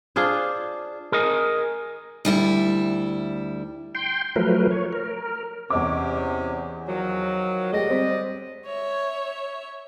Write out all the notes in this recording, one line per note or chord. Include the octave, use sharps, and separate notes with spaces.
D4 F4 G#4 C5
G#4 A#4 D#5
D2 G3 E4
G5 C6
F3 F#3 A3 A#4 B4
C#5
A#4
E2 C3 C#4 D#5 D6
D#3 F3 F#3
D2 G#3 G4 D5 D#5
G3 C4 B6
C#5 E5